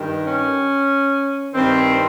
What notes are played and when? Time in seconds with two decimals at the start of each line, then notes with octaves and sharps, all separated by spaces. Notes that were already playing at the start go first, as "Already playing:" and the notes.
Already playing: G2 D#3
0.26 C#4
1.54 G2 D#3 C4